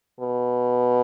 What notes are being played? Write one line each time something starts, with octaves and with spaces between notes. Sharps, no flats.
B2